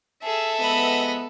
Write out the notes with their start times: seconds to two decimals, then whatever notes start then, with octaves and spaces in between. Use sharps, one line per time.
0.24 G#4 A4 E5
0.60 F3 G#3 B3 D#5 B5